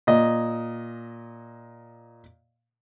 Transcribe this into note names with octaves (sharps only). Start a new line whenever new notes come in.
A#2 D#5